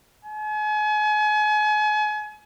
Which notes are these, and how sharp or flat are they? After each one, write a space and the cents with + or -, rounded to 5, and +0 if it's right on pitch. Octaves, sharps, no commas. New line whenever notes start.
G#5 +35